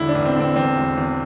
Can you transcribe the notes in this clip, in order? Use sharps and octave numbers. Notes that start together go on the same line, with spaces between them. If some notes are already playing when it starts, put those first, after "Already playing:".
Already playing: E1 D3 E4
D4
A1
C4
D3 C4
E2 C4
E1
E2